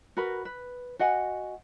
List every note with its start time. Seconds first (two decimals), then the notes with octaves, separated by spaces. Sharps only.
0.17 F#4 A#4 B4 B5
0.45 B4
0.99 F#4 D#5 F#5 G#5